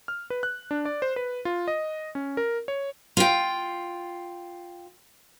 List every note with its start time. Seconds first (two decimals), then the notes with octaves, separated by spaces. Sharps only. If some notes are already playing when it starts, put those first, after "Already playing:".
0.08 F6
0.30 B4
0.43 F#6
0.71 D4
0.85 D5
1.02 C5
1.16 B4
1.45 F4
1.68 D#5
2.15 C#4
2.37 A#4
2.68 C#5
3.17 F4 G5